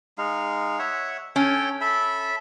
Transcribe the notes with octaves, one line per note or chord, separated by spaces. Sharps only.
G#3 D#4 F5
C#5 E5 F#5
C#4 A4 C#5 G5
A4 E5 B5